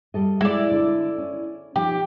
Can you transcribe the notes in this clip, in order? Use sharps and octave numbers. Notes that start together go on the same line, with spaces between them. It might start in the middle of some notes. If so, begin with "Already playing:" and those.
G3 A4 D#5
G#3 E4 D5
D3
C#4
F3 D#4 G4